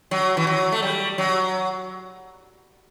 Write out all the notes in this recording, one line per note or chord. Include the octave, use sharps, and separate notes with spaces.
F#3
E3
F#3
A3
G3
F#3